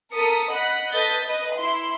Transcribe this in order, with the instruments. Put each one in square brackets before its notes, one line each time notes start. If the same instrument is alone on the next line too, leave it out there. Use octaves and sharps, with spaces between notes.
[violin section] A4 A#4 D#6 B6 C#7
D#5 F#5 B5 F#6 B6
A4 B4 D#5 G6 A6 B6
B4 D#5
E4 C6